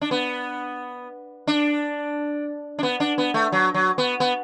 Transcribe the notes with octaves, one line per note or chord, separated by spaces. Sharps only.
D4
B3
D4
D4
B3
D4
B3
A3
F#3
F#3
B3
B3